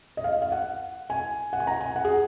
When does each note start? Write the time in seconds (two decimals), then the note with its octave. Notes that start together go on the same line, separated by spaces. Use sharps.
0.17 D#5
0.24 F5
0.42 F5
0.52 F#5
1.10 G#5
1.53 F#5
1.60 G#5
1.67 A#5
1.81 G#5
1.96 F#5
2.05 G#4